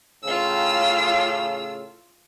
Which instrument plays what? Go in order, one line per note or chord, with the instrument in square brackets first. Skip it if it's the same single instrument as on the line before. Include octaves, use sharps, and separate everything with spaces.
[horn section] A2 C#3 [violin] F4 E6